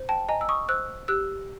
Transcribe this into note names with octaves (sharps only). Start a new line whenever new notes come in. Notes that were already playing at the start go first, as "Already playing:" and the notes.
Already playing: C5
G5 A5
D#5 G#5 A#5
E6
C#6 D#6
C5 E6 F#6
G4 E6 F#6